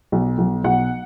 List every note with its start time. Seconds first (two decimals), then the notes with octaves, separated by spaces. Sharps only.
0.12 B1
0.38 B1
0.64 B1 F#5